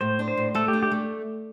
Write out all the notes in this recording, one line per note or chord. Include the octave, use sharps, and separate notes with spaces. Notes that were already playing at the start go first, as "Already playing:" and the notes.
A2 C5
D4
C5
A2
A3 A4
G4
D4
G4
A3